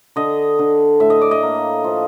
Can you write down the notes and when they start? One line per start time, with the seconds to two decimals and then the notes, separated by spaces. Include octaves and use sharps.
0.16 D3 D#5
0.59 D3
1.00 A2 E5
1.10 D#5
1.21 D5
1.31 D#5
1.43 A#3
1.84 F3